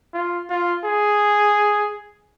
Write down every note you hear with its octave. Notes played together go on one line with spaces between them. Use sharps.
F4
F4
G#4